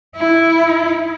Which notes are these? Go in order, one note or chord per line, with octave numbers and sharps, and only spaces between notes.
E4